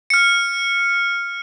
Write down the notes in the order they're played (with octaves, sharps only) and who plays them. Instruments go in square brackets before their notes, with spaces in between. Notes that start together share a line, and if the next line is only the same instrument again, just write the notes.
[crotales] F6 C#7